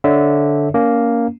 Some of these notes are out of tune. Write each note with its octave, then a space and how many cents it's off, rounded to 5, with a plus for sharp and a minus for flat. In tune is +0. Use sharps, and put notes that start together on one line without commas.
D3 -10 C#5 -5 E5 -20
A#3 +0 C#4 +30